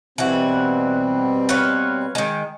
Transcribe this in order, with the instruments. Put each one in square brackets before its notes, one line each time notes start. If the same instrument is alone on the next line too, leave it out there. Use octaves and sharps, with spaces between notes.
[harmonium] B2 G3 C4 [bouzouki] E3 F#4
[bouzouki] B4 C#5 F5
D#3 G#3